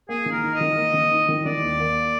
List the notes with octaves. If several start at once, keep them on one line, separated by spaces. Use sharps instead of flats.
A#3 G#4
D#3
A#4
D#4
D#5
D#3
A#3
D#3
D#4
D#3
D#3 D5
D#2
A#3